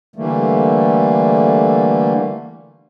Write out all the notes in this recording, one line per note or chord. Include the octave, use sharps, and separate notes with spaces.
D3 E3 G3 A3 A#3